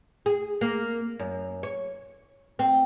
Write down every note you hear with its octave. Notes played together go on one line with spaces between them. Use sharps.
G#4
A#3
F#2
C#5
C4